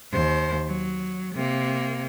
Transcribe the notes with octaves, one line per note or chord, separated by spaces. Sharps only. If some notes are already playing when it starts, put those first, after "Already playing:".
D#2 C5
F#3
C3 A#3